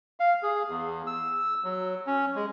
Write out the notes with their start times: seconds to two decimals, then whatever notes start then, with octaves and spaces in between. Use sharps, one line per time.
0.20 F5
0.43 G#4
0.68 E2
1.07 E6
1.64 F#3
2.07 C#4
2.36 G#3